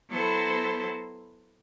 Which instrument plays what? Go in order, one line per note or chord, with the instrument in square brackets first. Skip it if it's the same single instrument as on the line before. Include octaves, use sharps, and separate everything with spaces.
[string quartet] F#3 B3 E4 A4 C5